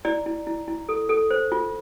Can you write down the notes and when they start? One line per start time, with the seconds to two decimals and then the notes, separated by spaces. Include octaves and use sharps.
0.05 E4 D5
0.26 E4
0.47 E4
0.68 E4
0.89 A4
1.09 A4
1.31 C5
1.52 F4